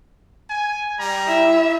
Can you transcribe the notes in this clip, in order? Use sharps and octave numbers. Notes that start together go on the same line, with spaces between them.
G#5
G3 A#5
E4 E5